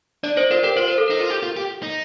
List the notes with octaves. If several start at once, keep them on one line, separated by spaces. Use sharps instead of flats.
D4 D5
D#4 C5
F4 A#4
G4 A#4
F4 C5
A#4
A4
D#4 A#4
F4
G4
F4
G4
D#4